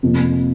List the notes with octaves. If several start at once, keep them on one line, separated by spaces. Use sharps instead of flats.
F2 C3 F3 A#3